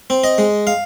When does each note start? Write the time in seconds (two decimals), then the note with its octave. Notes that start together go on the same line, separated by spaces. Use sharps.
0.10 C4
0.24 D#5
0.38 G#3
0.67 F5